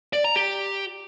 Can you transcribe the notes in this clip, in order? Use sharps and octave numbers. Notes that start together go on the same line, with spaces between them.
D5
A#5
G4